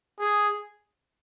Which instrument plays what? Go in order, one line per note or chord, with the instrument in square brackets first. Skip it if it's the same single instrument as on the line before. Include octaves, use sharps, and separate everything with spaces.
[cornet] G#4